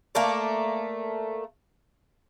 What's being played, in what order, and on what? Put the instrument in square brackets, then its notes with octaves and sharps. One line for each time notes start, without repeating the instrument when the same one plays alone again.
[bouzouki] A3 A#3 A#4 D5